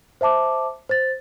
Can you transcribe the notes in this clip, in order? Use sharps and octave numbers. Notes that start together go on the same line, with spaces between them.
C5 E5 A5 D6
C5 A6